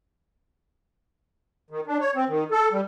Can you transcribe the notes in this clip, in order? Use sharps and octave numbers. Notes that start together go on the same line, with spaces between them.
D#3
D4
C#5
C4
D#3
A4
G3